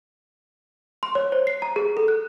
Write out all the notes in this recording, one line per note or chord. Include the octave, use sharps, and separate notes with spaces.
C6
C#5
C5
C7
A#5
G#4
A4
F#6